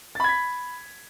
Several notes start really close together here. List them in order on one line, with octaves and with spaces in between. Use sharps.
A6 B5 G#6 B6